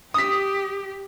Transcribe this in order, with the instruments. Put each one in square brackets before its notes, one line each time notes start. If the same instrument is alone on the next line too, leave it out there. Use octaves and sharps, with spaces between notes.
[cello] G4 [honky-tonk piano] D#6 B6